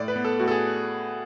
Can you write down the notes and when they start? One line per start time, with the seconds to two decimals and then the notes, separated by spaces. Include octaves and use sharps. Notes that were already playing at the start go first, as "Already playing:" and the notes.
Already playing: A2 D5
0.08 B4
0.16 B3
0.25 A4
0.39 A2 F#4
0.48 A4
0.51 G#4